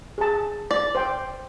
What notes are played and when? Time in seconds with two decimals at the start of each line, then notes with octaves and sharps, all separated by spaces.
0.18 G#4 A5
0.71 D5
0.95 C5 G5